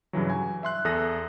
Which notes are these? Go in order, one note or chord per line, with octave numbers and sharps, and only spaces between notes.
G2 C#3 E3 F#3
G#5
E5 C6 F#6
E2 A4 E5 D#6 F#6 A#6